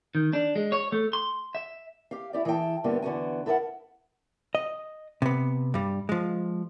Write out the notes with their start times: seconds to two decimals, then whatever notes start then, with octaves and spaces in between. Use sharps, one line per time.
0.15 D#3
0.33 D4
0.56 G#3
0.72 C#5
0.92 A3
1.13 C6
1.55 E5
2.11 G4 F5
2.33 E4 G4 D5
2.45 E3 G#4 A4 B4 G5 A5
2.84 G2 D3 A#3 B3 G4
3.02 E2 D3 B3 F#4 G#5
3.46 E4 A4 A#4 D5 F#5
4.55 D#5
5.22 C3 B3
5.74 G2 G3
6.09 F3 G#3